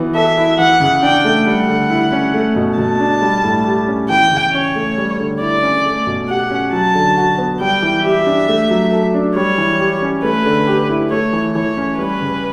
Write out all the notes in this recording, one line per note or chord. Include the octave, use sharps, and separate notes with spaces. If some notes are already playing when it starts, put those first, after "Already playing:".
Already playing: E3 B3 F#4
A4 E5
E4
E3 F#5
C#3
D4 G5
A3
G3 F#5
D3
E4
C#4
A3
B2
B2 A5
D4
G3
A2
G4
C#4
E3 G5
C#3
C#4 C#5
A3
G3
D3
E4 D5
C#4
A3
B2
G4 F#5
C#4
F#3 A5
D3
F#4
B3
G3 G5
E3
G4 E5
D4
A3
F#3
A4
D4
G3 C#5
E3
G4
C#4
A3 B4
D3
G4
E4
A3 C#5
E3
E3 C#5
C#4
G3 B4
C#3